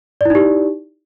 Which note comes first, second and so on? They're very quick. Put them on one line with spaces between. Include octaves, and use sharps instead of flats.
D5 E4 D#4 G4